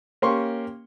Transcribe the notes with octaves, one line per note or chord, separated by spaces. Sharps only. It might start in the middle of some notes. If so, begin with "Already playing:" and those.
A#3 C#4 G4 C6 C#6